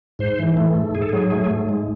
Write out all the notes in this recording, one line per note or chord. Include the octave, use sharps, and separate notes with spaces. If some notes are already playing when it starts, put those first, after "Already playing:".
G#2 C5
E3
A3
G#2
G#2 G#4
A4
F#3 G#4
A3
G#2
G#3